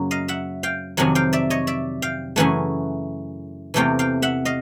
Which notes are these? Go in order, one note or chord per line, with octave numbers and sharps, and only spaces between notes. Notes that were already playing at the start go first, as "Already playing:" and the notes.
Already playing: F#2 C#3 F#3 A#3
D#5 F5
E5 F#5
F5 G5
F2 C3 D#3 F#3 F#5 G#5
F5 G5
D5 E5
C#5 D#5
D5 E5
F5 G5
F#2 C#3 E3 A3 F#5 G#5
E2 C3 E3 A3 F5 G5
F5 G5
E5 F#5
D#5 F5